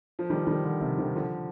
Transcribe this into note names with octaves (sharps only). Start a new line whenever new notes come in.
F3
D#3 G3
D#3 G3
D3 F3
C3 D#3
C3 D#3
D3 F3